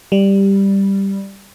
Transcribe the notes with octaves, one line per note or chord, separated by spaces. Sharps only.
G3